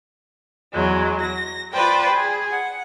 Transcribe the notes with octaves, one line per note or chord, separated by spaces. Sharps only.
E2 F#3 G#3
A#6
F4 B4 C5 D5 G5
G#4
F#5